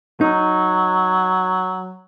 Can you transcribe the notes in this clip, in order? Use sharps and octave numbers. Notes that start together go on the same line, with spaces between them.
F#3 D#4